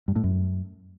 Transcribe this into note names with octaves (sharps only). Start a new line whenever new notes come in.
G2
A2
F#2